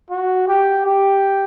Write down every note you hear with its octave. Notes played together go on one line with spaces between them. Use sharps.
F#4
G4
G4